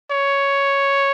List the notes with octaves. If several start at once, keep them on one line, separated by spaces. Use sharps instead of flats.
C#5